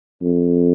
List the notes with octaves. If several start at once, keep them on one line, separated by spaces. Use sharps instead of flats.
F2